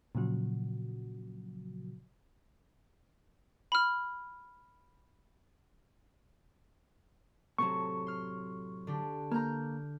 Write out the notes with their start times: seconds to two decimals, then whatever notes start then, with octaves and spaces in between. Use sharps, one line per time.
0.15 A#2 C#3 F3 F#3 F#4
3.72 B5 F6
7.58 A2 C3 F#3 A4 C#6
8.07 C6 F6
8.87 D3 D4 G4
9.32 A#3 A#5 F6 G6